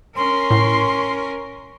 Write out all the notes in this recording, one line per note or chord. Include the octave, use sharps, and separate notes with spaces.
C#4 A#4 C6
A2